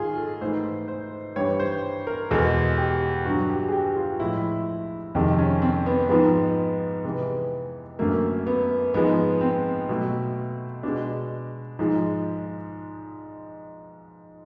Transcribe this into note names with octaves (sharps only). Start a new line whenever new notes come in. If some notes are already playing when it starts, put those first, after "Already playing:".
Already playing: G#2 D#3 F4 G#4
A4
G#2 E3 A3 C5
C5
G2 E3 G3 C#5
C5
A#4
E2 B2 G#3 A4
G4
G2 D3 F#3 F#4
G4
G#4
G4
F4
A2 F3 G#3 E4
F2 C3 D#3 G#3
C#4
C4
B3
G#2 F3 G#3 B3
C3 E3 G#3
F#2 D3 F#3 A3 A#3
B3
G#2 F3 G#3 B3
C4
B2 F#3 A3
B2 G#3 D4
G#2 F3 G#3